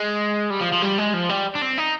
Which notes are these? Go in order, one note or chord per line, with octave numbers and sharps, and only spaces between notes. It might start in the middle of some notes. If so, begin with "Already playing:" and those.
Already playing: G#3
G3
F3
F3
G3
G#3
F3
G3
D4
C4
D#4